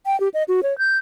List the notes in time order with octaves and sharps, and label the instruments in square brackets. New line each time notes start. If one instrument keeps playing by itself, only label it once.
[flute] G5
G4
D#5
F#4
C#5
G6